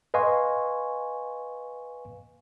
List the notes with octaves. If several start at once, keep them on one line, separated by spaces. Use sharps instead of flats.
B4 D#5 F5 G#5 C6 C#6